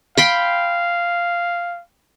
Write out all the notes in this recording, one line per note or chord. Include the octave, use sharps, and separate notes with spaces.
F5 G5 B5 C6